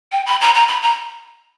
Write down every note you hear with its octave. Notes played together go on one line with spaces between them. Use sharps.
G5
B5
A#5
A#5
B5
A#5